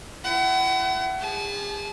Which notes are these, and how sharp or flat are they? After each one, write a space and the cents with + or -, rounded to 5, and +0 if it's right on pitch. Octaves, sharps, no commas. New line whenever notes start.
E4 +35 F#5 +40
G#4 -40 A5 -40